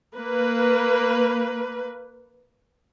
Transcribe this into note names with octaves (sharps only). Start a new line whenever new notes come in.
A#3 B4